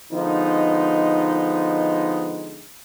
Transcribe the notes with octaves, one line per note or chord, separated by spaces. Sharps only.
D3 F3 G#3 B3 D#4